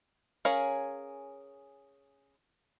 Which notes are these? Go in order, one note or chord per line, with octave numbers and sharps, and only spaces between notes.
C#4 G#4 A#4 C#5 F5